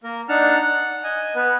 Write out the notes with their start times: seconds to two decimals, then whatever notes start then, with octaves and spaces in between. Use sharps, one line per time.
0.04 A#3 A#4
0.29 D4 D#4 F#5 A5 F6
0.62 F#5
1.04 D#5 G#5
1.35 B3 B4